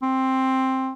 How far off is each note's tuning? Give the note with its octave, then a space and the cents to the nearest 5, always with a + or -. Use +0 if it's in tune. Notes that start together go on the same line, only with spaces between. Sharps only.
C4 +10